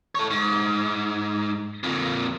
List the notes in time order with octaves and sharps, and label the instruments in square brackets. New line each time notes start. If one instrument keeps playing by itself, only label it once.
[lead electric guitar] A4 C#5
G#2
F2 A#2